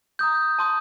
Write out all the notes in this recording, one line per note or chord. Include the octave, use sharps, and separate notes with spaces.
A#5 D#6 G6
A5 C6 D#6 G6